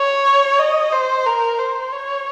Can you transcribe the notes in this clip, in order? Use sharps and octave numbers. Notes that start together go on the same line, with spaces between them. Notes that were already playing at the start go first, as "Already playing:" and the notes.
Already playing: C#5
D#5
C5
A#4
C5
C#5